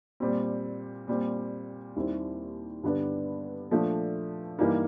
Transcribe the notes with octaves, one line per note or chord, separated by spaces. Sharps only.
A#2 G3 C4
A#2 G3 C4
D#2 D#3 G3 C4 E4
G2 D3 G3 B3 D4
A#2 F3 A3 D4
G2 E3 G3 A#3 D#4